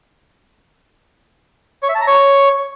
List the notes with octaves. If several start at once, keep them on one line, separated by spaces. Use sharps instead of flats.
C#5
E5
A5
A#5
C#5